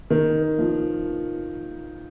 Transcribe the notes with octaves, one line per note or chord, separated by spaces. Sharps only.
D#3
F3